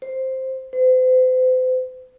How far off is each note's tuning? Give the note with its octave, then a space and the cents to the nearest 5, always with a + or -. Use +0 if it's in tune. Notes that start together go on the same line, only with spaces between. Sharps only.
C5 +5
C5 -40